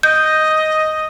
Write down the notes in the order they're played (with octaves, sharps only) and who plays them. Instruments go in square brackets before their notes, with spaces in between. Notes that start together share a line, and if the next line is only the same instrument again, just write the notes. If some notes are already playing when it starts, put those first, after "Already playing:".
[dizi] D#5 [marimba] G6